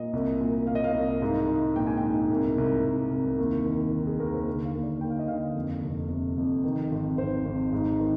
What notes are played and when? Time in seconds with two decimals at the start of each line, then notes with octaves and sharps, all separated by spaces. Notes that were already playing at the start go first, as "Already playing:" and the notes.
Already playing: A#2 D#5
0.13 C2
0.41 A#2
0.67 A#2 F5
0.75 D#5
0.84 F5
0.94 C2
1.22 G#2
1.48 G#2
1.76 A#1 G5
1.87 G#5
1.97 G5
2.03 G#2
2.30 C2
2.58 C2
2.85 C2
3.11 C2
3.38 D#2
3.66 D#3
3.93 D#3
4.07 G#4
4.20 D#2 A#4
4.33 C5
4.47 D3
4.65 F5
4.75 D#2
4.83 D5
5.01 D#2 G5
5.10 F5
5.19 D#5
5.28 D3 F5
5.56 F2
5.82 F1
6.10 C3
6.37 F2
6.64 D#3
6.91 G#1
7.18 G#1 C5
7.45 G#1
7.73 G#2
8.00 D#3